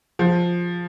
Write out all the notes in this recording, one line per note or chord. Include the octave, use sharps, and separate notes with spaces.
F3